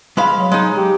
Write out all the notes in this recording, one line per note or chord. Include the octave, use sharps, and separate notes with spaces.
G#3 F5 B5
F#3
G#3 D#4
G4